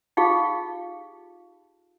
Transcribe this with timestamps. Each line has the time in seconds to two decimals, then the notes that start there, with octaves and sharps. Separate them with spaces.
0.17 D#4 F4 G4 G#4 F5